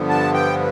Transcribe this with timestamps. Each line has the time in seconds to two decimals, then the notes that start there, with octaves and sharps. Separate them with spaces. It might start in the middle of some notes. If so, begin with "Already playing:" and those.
Already playing: G2 D3 F3 B3
0.09 A5
0.34 G5